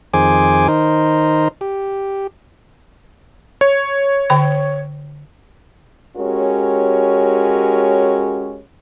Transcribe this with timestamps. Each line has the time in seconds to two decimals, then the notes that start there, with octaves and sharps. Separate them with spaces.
0.14 F2 D#3 G#4 C5 G#5 D6
0.68 D#3 D#4 A#4 C5
1.61 G4
3.61 C#5
4.30 D3 G5
6.17 G#3 C#4 F#4 G4 A#4 C#5